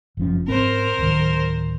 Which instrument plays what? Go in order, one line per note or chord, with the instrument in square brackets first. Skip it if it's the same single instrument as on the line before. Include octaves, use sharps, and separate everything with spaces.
[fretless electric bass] F#1 F3 C#4
[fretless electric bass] G#2 C4 [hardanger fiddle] A#4 C5
[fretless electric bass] D1 D#3